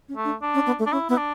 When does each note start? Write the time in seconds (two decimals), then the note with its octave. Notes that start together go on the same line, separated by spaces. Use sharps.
0.09 C#4
0.16 A3
0.25 D4
0.42 D4
0.54 C#4
0.67 B3
0.79 A3
0.86 D4
0.92 C#4 E4
1.09 B3 E4
1.17 D4